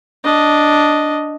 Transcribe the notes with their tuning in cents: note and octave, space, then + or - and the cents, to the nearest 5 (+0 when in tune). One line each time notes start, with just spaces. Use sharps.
D4 +0 D#5 +0